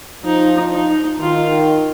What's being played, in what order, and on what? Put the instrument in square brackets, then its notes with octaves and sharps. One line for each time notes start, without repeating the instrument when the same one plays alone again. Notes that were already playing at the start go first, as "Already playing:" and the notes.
[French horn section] F3 [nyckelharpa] D#4
[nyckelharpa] D#4
[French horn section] D#3 [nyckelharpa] F4